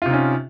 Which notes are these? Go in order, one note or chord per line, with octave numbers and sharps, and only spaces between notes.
C3 C#4 D#4 F4